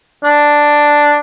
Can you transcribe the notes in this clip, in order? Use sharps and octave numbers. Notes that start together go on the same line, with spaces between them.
D4